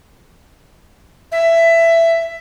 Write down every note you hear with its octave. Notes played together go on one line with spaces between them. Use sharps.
E5